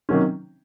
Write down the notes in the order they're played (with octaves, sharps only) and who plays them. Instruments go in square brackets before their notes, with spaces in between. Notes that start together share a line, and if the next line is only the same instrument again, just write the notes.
[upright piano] C3 D#3 F#3 A#3 C#4